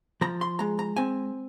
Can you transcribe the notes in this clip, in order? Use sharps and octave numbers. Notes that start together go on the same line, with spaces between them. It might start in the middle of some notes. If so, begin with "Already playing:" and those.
F3 A#5
C6
G#3 A#5
A#5
C4 G#5